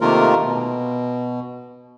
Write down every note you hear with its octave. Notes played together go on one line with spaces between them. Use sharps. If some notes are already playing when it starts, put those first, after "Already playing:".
C3 D#3 A3 A#3 F4 A#4
B2